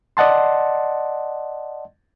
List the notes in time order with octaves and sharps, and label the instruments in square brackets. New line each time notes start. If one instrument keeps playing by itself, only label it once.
[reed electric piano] D5 D#5 F#5 A5 C6